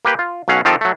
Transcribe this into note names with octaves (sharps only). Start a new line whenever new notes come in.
A#3 G4 B4 G5
F4
B1 F#3 C#4 F5 F#5
D#3 F3 C4 F4 G4 A4
F#3 A3